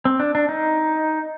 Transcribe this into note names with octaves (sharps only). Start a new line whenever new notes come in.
C4
D4
D4
D#4